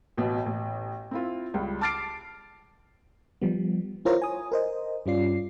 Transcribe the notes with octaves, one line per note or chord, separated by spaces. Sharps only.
A1 B2
A1
C4 E4 F4
C#2 G3
A5 D6 F6 A6 C7 D7
F3 G3 B3
E4 F4 A#4 C5 C#5 A#5
G#5 D#6
A#4 C5 D#5
G2 G3 C#4 F4 D5 C7